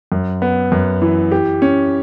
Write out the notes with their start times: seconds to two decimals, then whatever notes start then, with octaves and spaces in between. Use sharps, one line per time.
0.12 F#2
0.42 B3
0.72 F#2
1.02 E3
1.32 G4
1.62 C#4